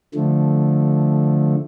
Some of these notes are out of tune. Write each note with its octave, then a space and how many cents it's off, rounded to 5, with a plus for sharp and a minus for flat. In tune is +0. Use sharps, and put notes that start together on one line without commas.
D3 +0 F3 +0 A3 -10